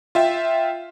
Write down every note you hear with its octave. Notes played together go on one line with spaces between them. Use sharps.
F4 E5 G5